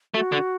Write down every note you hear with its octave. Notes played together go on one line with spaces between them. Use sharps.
A3 F#4
D3